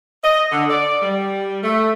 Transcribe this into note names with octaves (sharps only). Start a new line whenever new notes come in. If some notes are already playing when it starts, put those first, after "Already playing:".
D#5
D3
D5
G3
A3